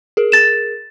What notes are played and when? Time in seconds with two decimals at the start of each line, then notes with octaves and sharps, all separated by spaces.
0.17 G#4 A#4
0.32 A6 E7